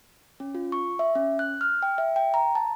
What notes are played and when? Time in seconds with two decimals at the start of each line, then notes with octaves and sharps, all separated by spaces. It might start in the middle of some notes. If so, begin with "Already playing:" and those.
0.40 C#4
0.55 F4
0.72 C#6
0.99 E5
1.15 C#4
1.39 F#6
1.61 F6
1.83 G5
1.98 E5
2.16 G5
2.34 A#5
2.55 A5